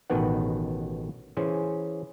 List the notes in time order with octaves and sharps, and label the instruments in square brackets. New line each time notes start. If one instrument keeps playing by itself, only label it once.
[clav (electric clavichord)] A1 B2 D#3 F#4 B4 F#5
E3 C#4 G#4 C5